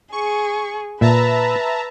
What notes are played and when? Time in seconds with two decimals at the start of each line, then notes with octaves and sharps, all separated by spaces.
0.12 G#4 C#6
1.01 A#2 B4 E5 A5 A#5